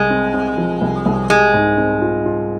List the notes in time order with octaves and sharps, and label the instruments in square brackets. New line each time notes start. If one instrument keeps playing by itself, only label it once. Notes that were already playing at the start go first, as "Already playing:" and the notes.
Already playing: [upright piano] C2 [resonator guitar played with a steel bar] G#3
[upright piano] C4
C4
F3
C2
C2
[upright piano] G3 [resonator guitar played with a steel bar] G#3
[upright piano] G#2
C4
F4
F4